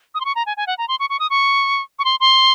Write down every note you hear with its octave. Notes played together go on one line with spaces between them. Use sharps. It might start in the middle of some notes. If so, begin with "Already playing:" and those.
D#6
C6
C#6
A#5
G#5
G#5
F#5
A#5
C6
C#6
C#6
D#6
C#6
C#6
C6
C6